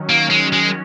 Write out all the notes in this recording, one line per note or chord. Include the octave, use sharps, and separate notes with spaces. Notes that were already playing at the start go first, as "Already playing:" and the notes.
Already playing: D#3 F#3 C#4
A#3
G#3
G#3